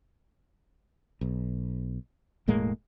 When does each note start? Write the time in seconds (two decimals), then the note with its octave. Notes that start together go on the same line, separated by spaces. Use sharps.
1.21 B1
2.48 E1 A2 G#3 A#3